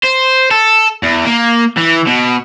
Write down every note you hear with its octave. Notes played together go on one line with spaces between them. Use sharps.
C5
A4
E2
A#3
E3
B2